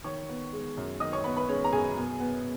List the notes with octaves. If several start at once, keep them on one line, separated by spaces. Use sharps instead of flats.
D#3 C#5 C#6
B3
G#3
F#2
D#3 D#5 D#6
C#5 C#6
B3 B4 B5
B4 B5
G#3 C#4 C#5
A#5
F#2 G#4 G#5
B2
B3